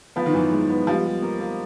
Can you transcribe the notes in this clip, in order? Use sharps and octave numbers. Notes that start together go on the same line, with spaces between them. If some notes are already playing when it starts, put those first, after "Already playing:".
F3 B3
D#3
F#2 E3
G#3
B3
F3 G3
G3
A#3
A#3